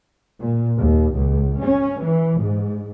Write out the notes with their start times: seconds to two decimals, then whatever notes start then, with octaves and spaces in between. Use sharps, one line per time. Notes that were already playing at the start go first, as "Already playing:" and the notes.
0.39 A#2
0.79 D#2
1.16 C#2
1.61 C#4
2.02 E3
2.41 G#2